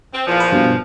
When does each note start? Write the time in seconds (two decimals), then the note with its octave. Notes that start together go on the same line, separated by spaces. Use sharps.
0.12 C4
0.27 E2 A#2 F3
0.40 B4
0.52 G2 B2